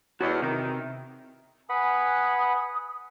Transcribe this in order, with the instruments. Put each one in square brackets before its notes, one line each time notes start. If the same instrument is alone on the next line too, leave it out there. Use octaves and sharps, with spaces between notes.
[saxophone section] E2 [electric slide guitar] F#4 C#5 D#5
[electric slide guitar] C3 [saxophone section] D#3
[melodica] B4 F#5 B5 [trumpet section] G#5 [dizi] D#6